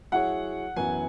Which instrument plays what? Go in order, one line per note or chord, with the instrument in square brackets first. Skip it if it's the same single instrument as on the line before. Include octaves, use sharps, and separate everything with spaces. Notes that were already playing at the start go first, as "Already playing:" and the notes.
[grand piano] F#3 E4 G#4 C#5 [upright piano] F#5
[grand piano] F#2 E3 B3 F#4 [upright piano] G#5